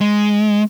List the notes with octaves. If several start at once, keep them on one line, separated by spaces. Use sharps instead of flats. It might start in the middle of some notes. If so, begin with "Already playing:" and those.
G#3